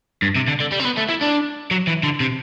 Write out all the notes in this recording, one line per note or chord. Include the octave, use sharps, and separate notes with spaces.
G2
C3
D3
D3
G3
C4
B3
A3
E4
D4
F#3
E3
D3
C3